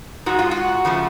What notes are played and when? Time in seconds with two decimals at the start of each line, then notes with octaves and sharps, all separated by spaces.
0.26 G#2 G#3 F#4
0.39 F4
0.51 F#4
0.85 C#3 F3 A3